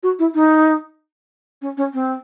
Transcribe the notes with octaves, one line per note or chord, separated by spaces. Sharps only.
F#4
E4
D#4
C#4
C#4
C4